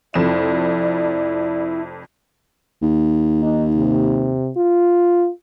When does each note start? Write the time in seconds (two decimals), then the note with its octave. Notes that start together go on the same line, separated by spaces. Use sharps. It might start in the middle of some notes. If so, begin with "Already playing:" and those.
0.14 F1 F2 E4 D5 E7
2.82 D#2
3.43 D#4
3.76 C3
4.57 F4